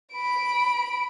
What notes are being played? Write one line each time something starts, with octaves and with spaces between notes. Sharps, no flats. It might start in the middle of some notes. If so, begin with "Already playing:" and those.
B5 D7